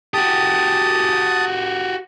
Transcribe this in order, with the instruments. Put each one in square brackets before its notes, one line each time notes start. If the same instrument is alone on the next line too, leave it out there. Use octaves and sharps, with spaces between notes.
[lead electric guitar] F#4 G4 [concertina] A5 D#6